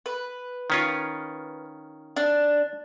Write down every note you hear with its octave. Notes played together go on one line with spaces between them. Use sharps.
B4
D#3 C#4 F4
D4